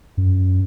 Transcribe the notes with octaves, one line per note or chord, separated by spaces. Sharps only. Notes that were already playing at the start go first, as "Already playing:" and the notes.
F#2